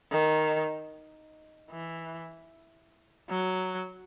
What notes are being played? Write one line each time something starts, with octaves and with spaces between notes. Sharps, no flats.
D#3
E3
F#3